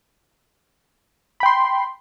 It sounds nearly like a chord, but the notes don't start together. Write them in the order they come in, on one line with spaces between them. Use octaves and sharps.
B5 G5 C6